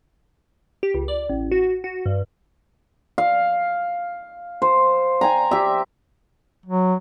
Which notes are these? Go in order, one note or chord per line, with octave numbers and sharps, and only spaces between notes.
G4
C#2
D5
A1
F#4
F#4
G2
F5
C5
G5 G#5 A#5
G4 E5
F#3